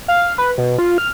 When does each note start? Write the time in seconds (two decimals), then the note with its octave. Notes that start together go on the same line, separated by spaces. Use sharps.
0.08 F5
0.38 B4
0.58 B2
0.78 F4
0.98 F6